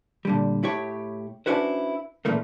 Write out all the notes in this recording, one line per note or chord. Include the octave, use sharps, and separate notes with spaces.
A#2 D3 G3
A2 E4 G4 C#5
C#4 D4 E4 F#4 B4 C5
A#2 C#3 E3 A3 A#3